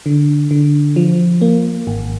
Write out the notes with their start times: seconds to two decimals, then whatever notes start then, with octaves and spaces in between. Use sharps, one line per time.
0.06 D3
0.51 D3
0.96 F3
1.41 A#3
1.87 G#1